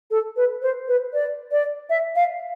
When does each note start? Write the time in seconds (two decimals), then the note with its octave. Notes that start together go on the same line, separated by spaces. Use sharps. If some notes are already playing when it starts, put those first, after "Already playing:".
0.11 A4
0.36 B4
0.62 C5
0.88 B4
1.13 D5
1.52 D5
1.90 E5
2.16 F5